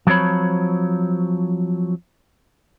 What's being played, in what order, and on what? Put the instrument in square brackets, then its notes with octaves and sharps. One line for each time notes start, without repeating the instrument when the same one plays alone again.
[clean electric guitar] F3 F#3 C4 C#5 B5